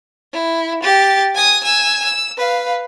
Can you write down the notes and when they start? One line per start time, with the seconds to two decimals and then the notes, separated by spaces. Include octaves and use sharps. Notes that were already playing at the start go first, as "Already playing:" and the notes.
0.33 E4
0.83 G4 A6
1.35 G#5 D#6
1.63 G#5 E6
2.04 E6
2.37 B4 F5